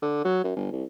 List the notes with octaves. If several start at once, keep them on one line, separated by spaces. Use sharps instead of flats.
D3
F#3
F#2
G1
C2